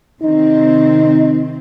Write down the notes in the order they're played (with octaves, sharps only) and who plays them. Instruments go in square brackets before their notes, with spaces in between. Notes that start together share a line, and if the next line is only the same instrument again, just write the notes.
[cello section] C3 D#3 C4 [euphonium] D#4